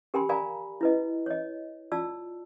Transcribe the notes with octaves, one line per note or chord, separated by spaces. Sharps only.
G4 A#4 G5 G#5 B5 C6
A#4 D5 F5 G#5 A#5 B5
E4 B4 D#5
C#5 D#5
F4 D5 A5 E6